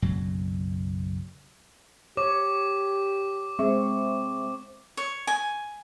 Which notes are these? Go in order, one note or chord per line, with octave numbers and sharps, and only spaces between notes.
F#1 B1 F#2 F#3
G4 C#5 D6
G#3 C4 E5 C#6
C#5
G#5